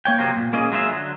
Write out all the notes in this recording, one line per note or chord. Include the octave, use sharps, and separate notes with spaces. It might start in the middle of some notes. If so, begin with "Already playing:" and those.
A#3 C#5 G5
C3 F3 F#3 A#3 C4
A#2
A#3 C#4 G#4 D#5
F#3 G#3 F4 G#4 B4 E5
D3 F#3